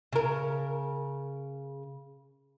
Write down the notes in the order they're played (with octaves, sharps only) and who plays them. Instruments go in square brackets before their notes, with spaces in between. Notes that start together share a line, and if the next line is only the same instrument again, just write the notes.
[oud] C#3 A#4